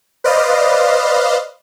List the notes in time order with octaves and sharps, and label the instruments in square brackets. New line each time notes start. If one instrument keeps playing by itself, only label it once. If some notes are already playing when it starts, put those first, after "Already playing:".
[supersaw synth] B4 C5 D5 D#5 F5